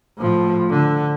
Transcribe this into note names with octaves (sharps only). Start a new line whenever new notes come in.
A2 F3
D3